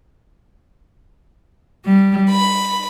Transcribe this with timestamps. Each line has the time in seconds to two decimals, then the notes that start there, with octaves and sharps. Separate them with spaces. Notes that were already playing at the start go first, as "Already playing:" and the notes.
1.85 G3
2.30 B5